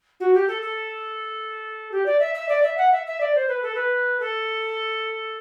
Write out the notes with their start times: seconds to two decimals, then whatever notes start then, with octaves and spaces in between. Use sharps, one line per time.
0.20 F#4
0.34 G4
0.47 A4
0.62 A4
1.91 G4
2.05 D5
2.19 E5
2.34 E5
2.48 D5
2.62 E5
2.77 F#5
2.92 E5
3.06 E5
3.20 D5
3.35 C5
3.48 B4
3.62 A4
3.75 B4
4.19 A4